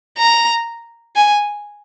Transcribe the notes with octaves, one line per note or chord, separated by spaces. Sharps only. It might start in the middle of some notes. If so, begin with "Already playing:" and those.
A#5
G#5